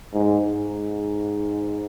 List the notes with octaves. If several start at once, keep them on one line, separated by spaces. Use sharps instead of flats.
G#2
G#2